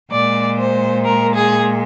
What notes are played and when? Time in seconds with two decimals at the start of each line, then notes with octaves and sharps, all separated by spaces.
0.11 A#2 G#3 D5
0.58 C5
1.04 A#4
1.35 G#4